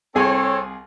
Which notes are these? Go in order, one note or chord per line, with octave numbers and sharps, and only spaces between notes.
C2 C4 G#4 A4 C#5 G#5